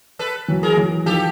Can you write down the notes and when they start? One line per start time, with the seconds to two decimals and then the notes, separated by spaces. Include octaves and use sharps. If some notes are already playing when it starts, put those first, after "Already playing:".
0.19 A4 B4
0.48 E3 F#3
0.63 G#4 A#4
0.77 E3 F#3
1.06 D#3 F3 G4 A4